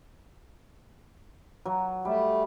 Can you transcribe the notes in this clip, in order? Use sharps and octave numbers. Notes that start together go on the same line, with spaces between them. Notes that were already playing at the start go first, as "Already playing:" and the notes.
F#3
G3 A3